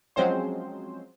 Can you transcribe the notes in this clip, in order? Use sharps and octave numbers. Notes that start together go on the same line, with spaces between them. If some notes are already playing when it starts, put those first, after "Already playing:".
F3 F#3 G#3 C4 C#4 C5